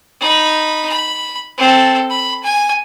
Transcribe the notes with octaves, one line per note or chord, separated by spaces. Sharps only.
D#4 B5
B5
C4 A4
B5
G#5